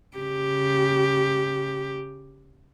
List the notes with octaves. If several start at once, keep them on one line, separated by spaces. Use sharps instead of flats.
C#3 G4